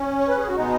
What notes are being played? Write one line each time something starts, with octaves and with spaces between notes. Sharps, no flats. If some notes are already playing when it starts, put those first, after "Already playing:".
Already playing: C#4
C#5
B4
G#4
F#4
B2 G#3 B3 D#4